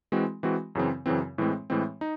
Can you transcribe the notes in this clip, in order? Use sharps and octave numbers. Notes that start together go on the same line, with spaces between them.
E3 G#3 C4 F#4
E3 G#3 C4 F#4
F#2 C#3 E3 C4
F#2 C#3 E3 C4
A2 E3 G#3 C4
A2 E3 G#3 C4
D#4